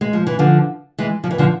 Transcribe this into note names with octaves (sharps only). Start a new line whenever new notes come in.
G#3
F3
E3
D3 F3
E3 G#3
F3
E3
D3 F3